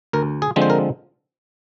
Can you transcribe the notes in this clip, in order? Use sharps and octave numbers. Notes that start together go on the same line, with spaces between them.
D2 A#4
G#4
D3 F3 G#3 C4
C5
A#4